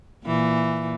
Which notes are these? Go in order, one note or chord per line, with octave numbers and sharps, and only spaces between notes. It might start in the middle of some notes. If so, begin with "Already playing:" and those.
A#2 E3